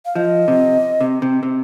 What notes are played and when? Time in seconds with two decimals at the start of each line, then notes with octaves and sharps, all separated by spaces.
0.06 F5
0.15 F3 D#5
0.48 C3
1.01 C3
1.22 C3
1.43 C3